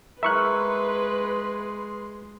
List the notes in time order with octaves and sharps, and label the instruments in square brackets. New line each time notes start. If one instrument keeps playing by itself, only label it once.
[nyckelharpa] G#3 C6 [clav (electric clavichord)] E4 A#4 [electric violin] B4 [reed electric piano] E5 C#6 F#6